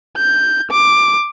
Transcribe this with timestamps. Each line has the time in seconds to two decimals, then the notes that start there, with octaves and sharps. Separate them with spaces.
0.17 G6
0.71 D6